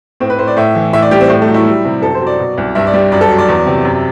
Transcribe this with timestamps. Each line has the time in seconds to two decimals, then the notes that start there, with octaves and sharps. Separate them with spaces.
0.20 A2 C4
0.30 B4
0.38 A2 C5
0.47 D5
0.57 A2 E5
0.75 E3
0.93 A2 E5
1.02 D5
1.11 G3 G4
1.21 C4
1.30 A2
1.42 A3
1.48 F#3
1.54 E4
1.66 G3
1.85 C3
2.02 F#2 A4
2.15 C5
2.21 F#3
2.27 D5
2.39 B2
2.58 C2
2.75 G2 E5
2.87 D5
2.93 G3
3.12 F#2 D5
3.21 A4
3.30 F#3
3.38 D5
3.48 E2
3.66 C3
3.85 F#2